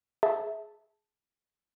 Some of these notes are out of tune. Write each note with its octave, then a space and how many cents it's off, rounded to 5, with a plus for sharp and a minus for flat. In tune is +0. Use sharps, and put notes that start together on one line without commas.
G#4 +15 E5 -15 A5 +0